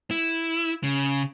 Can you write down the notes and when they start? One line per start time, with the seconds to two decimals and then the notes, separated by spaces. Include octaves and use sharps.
0.11 E4
0.83 C#3